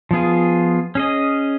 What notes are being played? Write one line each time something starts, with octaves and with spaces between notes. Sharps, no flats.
F3 B3 F4 G#4
C#4 G#4 D#5